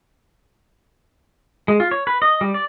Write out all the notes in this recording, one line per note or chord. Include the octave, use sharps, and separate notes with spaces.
G#3
F4
C#5
B4
D#5
G3
D5